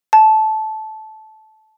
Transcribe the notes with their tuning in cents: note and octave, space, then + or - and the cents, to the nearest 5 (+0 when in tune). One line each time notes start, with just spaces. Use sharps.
A5 -15